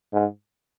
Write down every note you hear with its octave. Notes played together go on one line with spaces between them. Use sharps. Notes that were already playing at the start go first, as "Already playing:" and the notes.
G#2